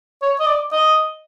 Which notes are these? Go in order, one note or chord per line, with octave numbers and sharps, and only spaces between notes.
C#5
D#5
D5
D#5